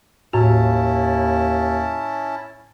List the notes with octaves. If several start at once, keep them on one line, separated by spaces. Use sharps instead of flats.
D#2 A2 C#4 E4 F#4 A5